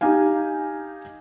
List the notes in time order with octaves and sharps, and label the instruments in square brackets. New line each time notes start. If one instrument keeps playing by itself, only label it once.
[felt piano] D#4 G4 F5 G#5